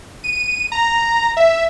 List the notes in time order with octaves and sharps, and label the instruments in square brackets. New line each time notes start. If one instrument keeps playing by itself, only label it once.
[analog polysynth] D#7
A#5
E5